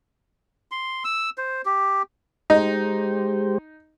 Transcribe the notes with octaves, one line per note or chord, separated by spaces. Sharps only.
C6
E6
C5
G4
G#3 D#4 G4 C5